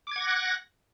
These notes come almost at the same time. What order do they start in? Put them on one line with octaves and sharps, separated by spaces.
D6 G#6 F#5 A#6 F#6